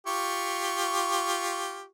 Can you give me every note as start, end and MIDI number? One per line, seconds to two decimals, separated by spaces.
0.07 1.85 65
0.07 1.85 67
0.07 1.85 85